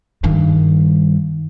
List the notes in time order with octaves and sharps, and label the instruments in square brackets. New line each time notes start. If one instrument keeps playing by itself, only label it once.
[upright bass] G2 D#3